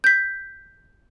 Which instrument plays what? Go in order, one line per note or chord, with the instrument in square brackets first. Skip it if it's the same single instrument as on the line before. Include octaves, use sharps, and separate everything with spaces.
[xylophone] G6 B6